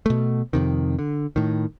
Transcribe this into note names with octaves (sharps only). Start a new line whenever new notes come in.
B2 A3
F2 C3 D#3
D3
A2 D#3